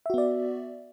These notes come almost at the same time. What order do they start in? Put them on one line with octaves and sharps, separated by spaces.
E5 F#4 B3 D5